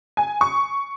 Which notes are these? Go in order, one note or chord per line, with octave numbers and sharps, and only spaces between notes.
G#5
C#6